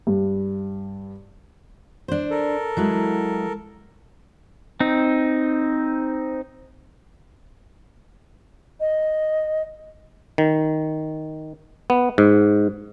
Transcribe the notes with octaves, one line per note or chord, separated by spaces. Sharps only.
G2
D4 C5
A4 A#4
F#3 G#3 E4
C4 D#4
D#5
D#3
B3
G#2